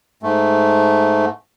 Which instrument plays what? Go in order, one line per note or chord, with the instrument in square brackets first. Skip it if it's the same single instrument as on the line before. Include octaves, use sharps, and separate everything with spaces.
[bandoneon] G#2 A3